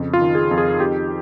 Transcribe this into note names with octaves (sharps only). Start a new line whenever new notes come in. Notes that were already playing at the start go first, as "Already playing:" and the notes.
Already playing: F2 C#3
F4
D#3
G#4
F2
G#4
F2 G4